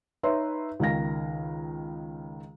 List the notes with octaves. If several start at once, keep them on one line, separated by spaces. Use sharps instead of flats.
D#4 B4 C#5 E5 C6
C#2 D#3 F5 A#6